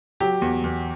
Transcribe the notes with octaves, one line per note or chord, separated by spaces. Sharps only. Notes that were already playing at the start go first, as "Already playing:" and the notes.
F#3 G4
E2
E2